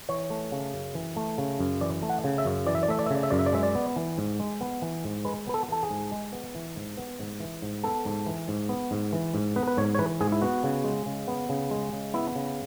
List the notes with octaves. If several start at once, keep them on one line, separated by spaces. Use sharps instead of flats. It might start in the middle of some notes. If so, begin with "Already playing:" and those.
E3 C#5
A3
C#3
F#2
E3
A3
C#3
F#2
E3 D5
A3
F#5
C#3
E5
F#2
E3 D5
E5
D5
A3 E5
D5
E5
C#3 D5
E5
F#2 D5
E5
D5
G#3 E5
D5
B3
E3
G#2
G#3
B3
E3
G#2
G#3 B4
B3 B4
A4
E3 A4
G#4
G#2
G#3
B3
E3
G#2
B3
G#2
E3
G#2
B3 A4
G#2
E3
G#2
B3
G#2
E3
G#2
B3 B4
B4
G#2 C#5
C#5
E3 B4
G#2 G#4
E4
B3 F#4
C#3
G#3
C#3
B3
C#3
G#3
C#3
B3 E4
C#3